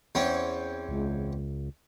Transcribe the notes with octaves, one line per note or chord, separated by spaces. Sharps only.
E2 C4 C#4
C#2